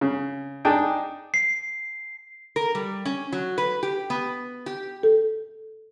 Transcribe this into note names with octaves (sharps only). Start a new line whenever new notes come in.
C#3
D4 D#4 G#4 G5
C7
A#4
G3
C#4
F#3
B4
G4
B3
G4
A4